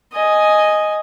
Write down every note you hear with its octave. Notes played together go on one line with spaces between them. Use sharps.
D#5 G#5